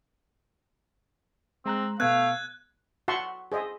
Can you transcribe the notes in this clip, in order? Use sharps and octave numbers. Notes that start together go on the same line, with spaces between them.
G#3 C4 A#5 F#6
B2 A3 B3 F5 F#6 G#6
F#4 E5 F#5 A5 C6 C#6
G#4 C5 D#5 E5